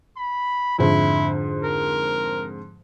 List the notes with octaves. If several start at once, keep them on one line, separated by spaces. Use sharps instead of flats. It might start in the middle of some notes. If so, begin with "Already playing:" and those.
B5
F2 G#2 D3 E4
A#4